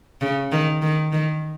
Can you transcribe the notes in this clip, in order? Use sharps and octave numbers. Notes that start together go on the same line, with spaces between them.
C#3
D#3
D#3
D#3